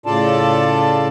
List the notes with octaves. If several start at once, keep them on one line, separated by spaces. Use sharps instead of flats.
A2 C#3 F4 A4 D5 A5